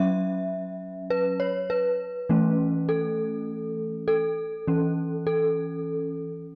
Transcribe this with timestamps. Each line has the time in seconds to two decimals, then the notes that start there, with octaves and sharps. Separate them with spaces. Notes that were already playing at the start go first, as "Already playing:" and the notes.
Already playing: F#3 C#4 E5
1.10 B4
1.40 C#5
1.70 B4
2.29 E3 A3 C#4
2.89 A4
4.08 A4
4.67 E3 C#4
5.27 A4